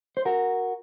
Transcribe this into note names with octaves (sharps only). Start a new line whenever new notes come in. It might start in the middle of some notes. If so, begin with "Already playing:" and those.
C5
F#4 A#4